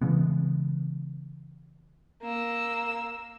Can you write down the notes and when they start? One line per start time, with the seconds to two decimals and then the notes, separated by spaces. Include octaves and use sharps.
0.01 C#3 E3 G#3 B3
2.23 A#3 E6